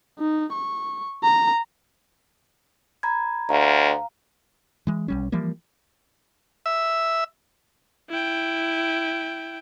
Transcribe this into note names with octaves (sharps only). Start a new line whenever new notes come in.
D#4
C#6
A#5
A#5 B5 G#6
D2 F5 A#5
E3 G#3
B1 G3 C#4
E3 F3 G3 A#3
E5
E4 G5